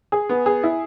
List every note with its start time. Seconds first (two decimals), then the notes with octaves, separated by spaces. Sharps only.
0.12 G#4
0.29 B3
0.46 G#4
0.63 E4